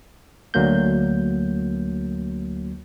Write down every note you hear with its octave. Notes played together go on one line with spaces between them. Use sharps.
D2 F#3 A#3 G6